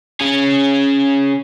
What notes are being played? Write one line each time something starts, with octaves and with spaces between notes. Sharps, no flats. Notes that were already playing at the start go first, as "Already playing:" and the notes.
C#4 G#4